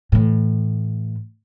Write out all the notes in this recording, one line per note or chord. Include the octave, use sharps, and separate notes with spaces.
A2 E3